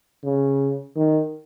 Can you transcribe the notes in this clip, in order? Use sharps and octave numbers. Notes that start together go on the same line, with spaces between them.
C#3
D#3